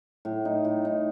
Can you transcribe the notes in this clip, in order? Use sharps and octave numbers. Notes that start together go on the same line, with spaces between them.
A2
D#4
A2
D#4